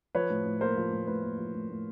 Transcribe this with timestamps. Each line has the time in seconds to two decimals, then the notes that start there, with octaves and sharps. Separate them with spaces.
0.15 F3 B4 C#5
0.30 A2
0.45 A2
0.61 A#3 A#4 C5
0.77 F3
0.92 A2
1.07 A2 B4
1.23 A#3
1.38 F3
1.54 A2
1.70 A2